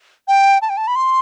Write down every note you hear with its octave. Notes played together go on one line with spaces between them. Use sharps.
G5
A5
G5
A5
B5
C6